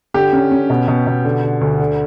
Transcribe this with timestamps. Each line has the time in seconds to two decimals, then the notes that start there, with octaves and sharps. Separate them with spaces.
0.14 D3 G4
0.33 C#4
0.51 C#4
0.70 B2
0.88 B2
1.07 B2
1.24 D3
1.43 D3
1.61 D2
1.79 D3